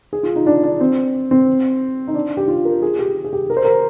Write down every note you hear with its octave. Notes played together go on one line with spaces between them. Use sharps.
G#4
F4
D#4
D4
D4
C4
C4
D#4
D4
G4
F4
A#4
G#4
G4
G#4
G4
A#4
C5
A#4